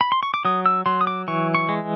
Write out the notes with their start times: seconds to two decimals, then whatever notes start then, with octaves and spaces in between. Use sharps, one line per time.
0.01 B5
0.12 C6
0.23 C#6
0.34 D6
0.45 F#3 D#6
0.66 E6
0.86 F#3 C6
1.01 D#6
1.07 D6
1.28 E3 C#6
1.55 C#6
1.69 G#3